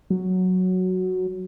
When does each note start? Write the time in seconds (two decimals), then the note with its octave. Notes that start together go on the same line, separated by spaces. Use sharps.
0.10 F#3